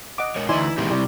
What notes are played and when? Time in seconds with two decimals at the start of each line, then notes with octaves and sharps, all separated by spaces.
0.18 D#5 F#5 D6
0.36 G#3 A#4 C#5
0.49 D2 E3 D#4 E4 D5 G#5 C6
0.78 A#2 D#3 G#3 E4 G4
0.91 C3 G3